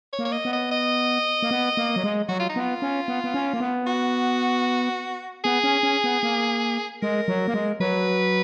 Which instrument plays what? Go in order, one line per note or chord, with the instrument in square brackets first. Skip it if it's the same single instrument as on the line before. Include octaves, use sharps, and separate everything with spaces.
[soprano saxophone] C#5
[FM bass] A#3
[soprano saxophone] C#5
D#5
[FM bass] B3
[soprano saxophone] D#5
D#5
[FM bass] A#3
B3
A#3
F#3
G#3
[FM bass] F#3 [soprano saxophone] F#4
[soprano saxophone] F4
D#4
[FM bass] B3 [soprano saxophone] F4
[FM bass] C#4
B3
B3
C#4
A#3
B3
[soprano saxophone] F#4
[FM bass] B3 [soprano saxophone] G#4
[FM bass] C#4
C#4
B3
A#3
[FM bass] G#3 [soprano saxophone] A#4
[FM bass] F#3
A#3
G#3
[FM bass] F#3 [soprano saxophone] B4